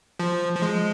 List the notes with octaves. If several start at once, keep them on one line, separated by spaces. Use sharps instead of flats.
F3
F3
G#3